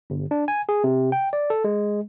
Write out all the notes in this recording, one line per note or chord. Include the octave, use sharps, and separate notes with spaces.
G1
D4
G#5
G#4
C3
G5
D5
A4
G#3